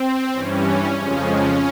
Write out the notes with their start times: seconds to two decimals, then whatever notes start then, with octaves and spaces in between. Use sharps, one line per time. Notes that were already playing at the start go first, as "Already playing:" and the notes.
Already playing: C4
0.33 G2 E3 G3 C#4
0.97 F2 C#3 F3 G#3 C#4
1.30 C#4